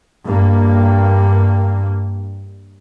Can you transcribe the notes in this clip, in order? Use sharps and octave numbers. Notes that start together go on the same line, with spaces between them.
G2 A#3